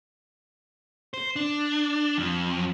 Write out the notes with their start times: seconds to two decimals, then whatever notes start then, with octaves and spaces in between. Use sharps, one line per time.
1.14 C5
1.36 D4
2.18 F2